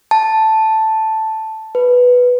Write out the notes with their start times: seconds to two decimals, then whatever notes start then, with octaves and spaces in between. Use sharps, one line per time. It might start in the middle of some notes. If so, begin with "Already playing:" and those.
0.11 A5
1.75 B4